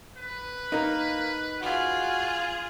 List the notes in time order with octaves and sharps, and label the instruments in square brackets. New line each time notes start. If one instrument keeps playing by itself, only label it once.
[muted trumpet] B4
[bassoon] A#3 [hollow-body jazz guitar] D#4 A#4
[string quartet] F4 G#4 F5 [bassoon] F#4